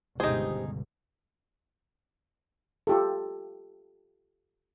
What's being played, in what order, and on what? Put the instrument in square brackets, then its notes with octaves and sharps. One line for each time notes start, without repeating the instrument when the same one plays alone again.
[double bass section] G1 C#2 B2 [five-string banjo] D#4 G#4 [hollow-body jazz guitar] G4 C5
[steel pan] F4 G4 A4